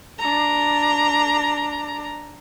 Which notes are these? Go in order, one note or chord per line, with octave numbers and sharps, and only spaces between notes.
D4 A#5